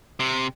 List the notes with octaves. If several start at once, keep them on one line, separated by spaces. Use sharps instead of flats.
C3